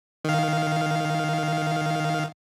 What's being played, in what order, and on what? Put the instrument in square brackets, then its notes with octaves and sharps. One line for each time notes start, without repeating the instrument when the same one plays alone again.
[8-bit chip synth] D#3 F5